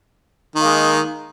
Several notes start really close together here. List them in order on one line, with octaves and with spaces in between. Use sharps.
D#3 A#3 G#3